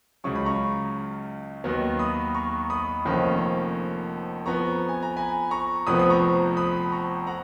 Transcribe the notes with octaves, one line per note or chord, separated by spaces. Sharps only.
C#2 C#3 F#3 C#6
B5
A#5 C#6
D#2 D#3 F#3 B3
B5 D#6
A#5 C#6
B5 D#6
F1 F2 D#3 A#3 C#4
F2 F3 B3 A#5 C#6
G#5
A#5
G#5 B5
A#5 C#6
F1 F2 F3 B3 B5 D#6
D#6
A#5 C#6
B5 D#6
A#5 C#6
F#5 A#5